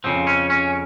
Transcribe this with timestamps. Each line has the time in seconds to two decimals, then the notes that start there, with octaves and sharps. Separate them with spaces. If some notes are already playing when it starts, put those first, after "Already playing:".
0.04 F2 C#3 F3 C4
0.27 C#4
0.50 C#4